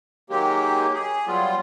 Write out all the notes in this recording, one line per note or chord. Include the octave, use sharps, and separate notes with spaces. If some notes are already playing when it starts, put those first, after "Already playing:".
D#3 F#3 G#3 A#3 G4
G#4
F#3 G3 B3 F4